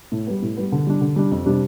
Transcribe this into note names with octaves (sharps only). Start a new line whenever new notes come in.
A2
G3 B3
A2
G3 B3
D3
G3 D4
D3
G3 D4
F2
C3 G3 D4